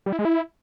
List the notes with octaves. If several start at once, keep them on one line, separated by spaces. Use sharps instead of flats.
G3
E4
G#3
E4